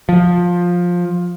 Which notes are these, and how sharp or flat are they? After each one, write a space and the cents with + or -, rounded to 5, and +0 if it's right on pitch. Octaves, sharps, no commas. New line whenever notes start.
F3 +15